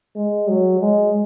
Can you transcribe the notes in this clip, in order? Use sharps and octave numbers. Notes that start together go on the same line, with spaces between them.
G#3
F#3
G#3